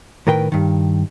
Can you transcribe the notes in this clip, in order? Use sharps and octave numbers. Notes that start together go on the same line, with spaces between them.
A2 D#3 A#4 B4 G5
G2 D#3